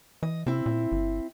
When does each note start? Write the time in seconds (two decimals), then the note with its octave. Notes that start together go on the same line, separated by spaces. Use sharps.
0.23 E3 D#5
0.46 C3 C4 E4
0.66 A#2
0.92 G1